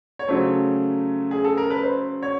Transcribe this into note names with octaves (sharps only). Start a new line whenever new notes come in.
C#5
C#3 F#3 A3 C5
G#4
A4
A#4
B4
C5
C#5